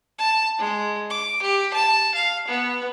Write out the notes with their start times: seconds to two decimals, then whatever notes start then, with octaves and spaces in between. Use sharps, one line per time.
0.19 A5
0.59 G#3
1.10 D6
1.42 G4
1.74 A5
2.15 F5
2.48 B3